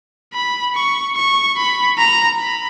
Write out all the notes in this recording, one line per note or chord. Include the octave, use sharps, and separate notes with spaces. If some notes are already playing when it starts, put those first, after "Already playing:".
B5
C#6
C#6
B5
A#5
B5